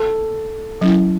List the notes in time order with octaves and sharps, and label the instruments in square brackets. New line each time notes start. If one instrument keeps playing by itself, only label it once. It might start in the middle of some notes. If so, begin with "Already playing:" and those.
Already playing: [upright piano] A4
[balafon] F#3 C#4 E4